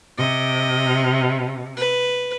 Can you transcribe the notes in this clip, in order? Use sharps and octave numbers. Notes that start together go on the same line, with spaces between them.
C3 D#5
B4